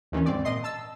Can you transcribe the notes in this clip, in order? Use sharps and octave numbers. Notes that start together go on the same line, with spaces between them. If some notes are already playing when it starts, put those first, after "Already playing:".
D#2 D#3 E3 C#4
G#2 C4 D5
A#2 D#5 C6
A5 E6